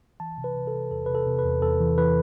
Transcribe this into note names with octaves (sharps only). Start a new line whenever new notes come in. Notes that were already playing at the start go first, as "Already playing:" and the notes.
E3 A5
C3
B4
C3
A4
C3
E2 A4
C3 B4
A4
C3
B4
E2
E2 A4
E3
E3 B4